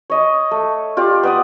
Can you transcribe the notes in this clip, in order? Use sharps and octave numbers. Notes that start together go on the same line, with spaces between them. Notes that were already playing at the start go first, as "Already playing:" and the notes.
C#5 D#5 A5
A3
F4 G4 D5
B3 D5 D#6